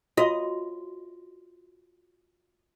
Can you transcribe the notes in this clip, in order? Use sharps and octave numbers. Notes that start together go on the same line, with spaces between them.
F4 F#4 D#5 C6